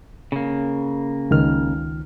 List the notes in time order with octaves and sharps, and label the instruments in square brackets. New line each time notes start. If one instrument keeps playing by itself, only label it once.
[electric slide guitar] C#3 A#3
[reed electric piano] C#2 D#3 F6